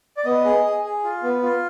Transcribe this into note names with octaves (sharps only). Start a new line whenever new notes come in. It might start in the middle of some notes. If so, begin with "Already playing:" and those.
D5
B3 D#5
G#4
G#4
G#4
F4
B3
F4